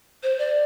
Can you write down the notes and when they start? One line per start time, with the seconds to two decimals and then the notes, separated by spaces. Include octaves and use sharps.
0.23 C5
0.39 D5